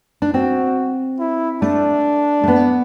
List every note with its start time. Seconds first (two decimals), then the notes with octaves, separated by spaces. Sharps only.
0.22 D4
0.34 C4 F#4
1.19 E4
1.62 A3 D4
2.43 A3
2.48 B3